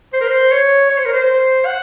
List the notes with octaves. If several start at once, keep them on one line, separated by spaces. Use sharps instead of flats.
C5
A#4
C5
C#5
C#5
C5
A#4
C5
F#5